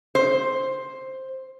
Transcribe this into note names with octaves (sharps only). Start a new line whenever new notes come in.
C5